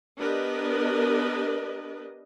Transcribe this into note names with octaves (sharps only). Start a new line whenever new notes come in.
B3 D4 G4 A#4 B4 D#5